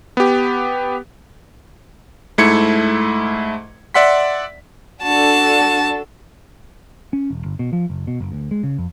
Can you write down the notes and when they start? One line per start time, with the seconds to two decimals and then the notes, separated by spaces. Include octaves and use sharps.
0.17 B3 G4
2.38 G#2 A3 E4 G#6 C#7
3.94 D5 E5 F#5 C6 B6
5.03 D4 F#4 A4 A5
7.13 C#4
7.30 E1
7.45 G1
7.59 B2
7.73 F3
7.90 F#1
8.07 B2
8.21 F#1
8.32 D2
8.51 G#3
8.63 C#3
8.78 F2